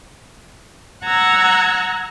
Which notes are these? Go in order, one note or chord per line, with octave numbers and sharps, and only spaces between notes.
F#5 A#5 E6 F#6 G#6